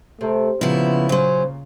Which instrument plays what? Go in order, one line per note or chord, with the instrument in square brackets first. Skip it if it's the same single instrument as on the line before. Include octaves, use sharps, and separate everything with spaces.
[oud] C3 [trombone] A3
[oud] A#2 [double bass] C#3 [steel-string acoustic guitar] F3 E4 [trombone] B3
[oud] A#2 [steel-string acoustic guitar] F#3 C#4 [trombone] C5